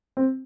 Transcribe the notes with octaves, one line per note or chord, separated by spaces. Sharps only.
C4